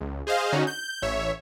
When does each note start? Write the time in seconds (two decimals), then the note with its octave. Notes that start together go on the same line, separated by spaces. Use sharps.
0.01 C#2
0.27 G#4 C5 D#5 F5
0.53 D3 C#4 D#4 F#4
0.67 G6
1.02 A1 C#5 E5